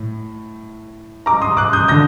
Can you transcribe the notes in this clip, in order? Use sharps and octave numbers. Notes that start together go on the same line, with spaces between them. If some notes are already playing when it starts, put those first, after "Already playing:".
Already playing: A2
A#5 D6
C6 D#6
D6 F#6
D#6 G6
D3 G6 A#6